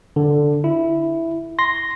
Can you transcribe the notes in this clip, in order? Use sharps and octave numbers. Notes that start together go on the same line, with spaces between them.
D3
E4
C6 A#6